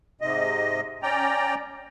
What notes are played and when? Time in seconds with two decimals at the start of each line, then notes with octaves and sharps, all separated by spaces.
0.21 G#2 C3 D#5
1.03 C#4 D5 G5 A#5